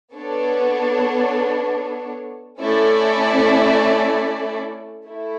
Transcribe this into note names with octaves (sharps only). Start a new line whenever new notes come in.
B3 D4 A4 C#5
A3 C#4 E4 A4 D5
A3 E4